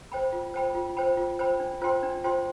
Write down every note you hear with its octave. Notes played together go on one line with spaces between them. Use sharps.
C5 G5 B5
F4
C5 G5 B5
F4
C5 G5 B5
F4
C5 G5 B5
D4
F4 C5 G5 C6
D4
F4 C5 G5 C6